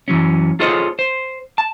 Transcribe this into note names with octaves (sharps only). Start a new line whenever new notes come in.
F#2 E3 F#3 C#4
F4 G#4 A4 C5 C#5 D#5
C5
A5